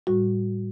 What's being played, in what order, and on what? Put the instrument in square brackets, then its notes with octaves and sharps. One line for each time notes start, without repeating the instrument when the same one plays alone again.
[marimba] A2 G3 F#4